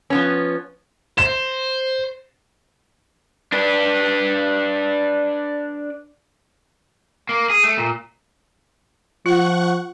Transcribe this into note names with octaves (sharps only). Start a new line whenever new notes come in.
F3 B3 C#4
C5 E7
D4 B4
A#3
G#4
A3
A#2
F3 F4 F#5 C#6 F#6